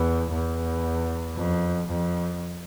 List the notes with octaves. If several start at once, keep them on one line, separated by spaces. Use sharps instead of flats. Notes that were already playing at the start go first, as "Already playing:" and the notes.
Already playing: E2
E2
F2
F2